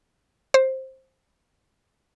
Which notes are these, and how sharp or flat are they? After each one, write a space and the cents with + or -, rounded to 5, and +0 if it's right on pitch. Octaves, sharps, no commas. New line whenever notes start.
C5 +10